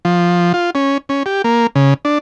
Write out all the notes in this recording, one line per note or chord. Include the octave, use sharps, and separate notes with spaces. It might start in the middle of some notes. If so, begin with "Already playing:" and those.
F3
F4
C#4
C#4
G4
A#3
C#3
D4